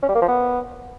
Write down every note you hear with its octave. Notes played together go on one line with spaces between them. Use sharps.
C#4
G3
A#3
F3
B3